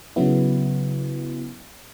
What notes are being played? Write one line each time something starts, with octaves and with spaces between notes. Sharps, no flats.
C#3 F#3 B3 E4